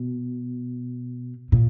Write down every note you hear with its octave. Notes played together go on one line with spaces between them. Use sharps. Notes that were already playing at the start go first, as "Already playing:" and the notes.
Already playing: B2
A#2